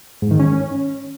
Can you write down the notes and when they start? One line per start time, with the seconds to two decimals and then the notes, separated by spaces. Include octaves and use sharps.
0.22 G#2
0.31 D#3
0.40 C#4